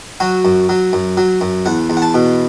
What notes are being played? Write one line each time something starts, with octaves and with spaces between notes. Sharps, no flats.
F#3 F#4
F#2
F#3
F#2
F#3
F#2
E2 F#5
E2
F#5
A5
B2